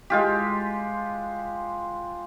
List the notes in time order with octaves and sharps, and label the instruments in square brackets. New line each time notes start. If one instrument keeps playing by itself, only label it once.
[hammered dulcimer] G#3 F4 G4